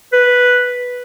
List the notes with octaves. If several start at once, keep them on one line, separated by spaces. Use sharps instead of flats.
B4